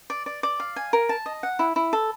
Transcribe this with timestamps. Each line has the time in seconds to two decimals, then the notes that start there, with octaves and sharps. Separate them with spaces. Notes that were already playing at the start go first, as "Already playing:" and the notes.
0.10 D5
0.26 D5
0.43 D5
0.60 F5
0.76 G#5
0.93 A#4
1.09 A5
1.26 D#5
1.43 F#5
1.59 E4
1.76 E4
1.93 A4